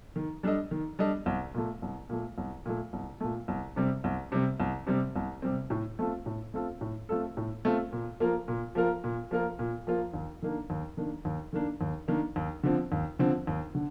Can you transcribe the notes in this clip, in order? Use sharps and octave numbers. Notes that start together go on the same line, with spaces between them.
D#3
G3 D4 A4 D#5
D#3
G3 D4 A4 D#5
C2
A#2 A3
C2
A#2 A3
C2
A#2 A3
C2
A#2 A3
C2
C3 G3 C4
C2
C3 G3 C4
C2
C3 G3 C4
C2
C3 G3 C4
A2
A3 C4 F4 A4
A2
A3 C4 F4 A4
A2
A3 C4 F4 A4
A2
A3 C4 F4 A4
A#2
F3 A#3 F4 A#4
A#2
F3 A#3 F4 A#4
A#2
F3 A#3 F4 A#4
A#2
F3 A#3 F4 A#4
D#2
D#3 A#3 D4
D#2
D#3 A#3 D4
D#2
D#3 A#3 D4
D#2
D#3 A#3 D4
D#2
D3 F3 C4
D#2
D3 F3 C4
D#2
D3